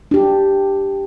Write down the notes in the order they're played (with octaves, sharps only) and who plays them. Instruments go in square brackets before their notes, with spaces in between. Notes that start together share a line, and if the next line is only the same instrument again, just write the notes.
[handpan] D4 G4